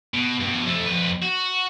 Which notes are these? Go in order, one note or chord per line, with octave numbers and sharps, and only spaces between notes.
B2
G2 B2
F2 A3
F2 B4
F#4